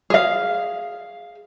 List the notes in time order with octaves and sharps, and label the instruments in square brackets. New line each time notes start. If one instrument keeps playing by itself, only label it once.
[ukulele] G#4 F5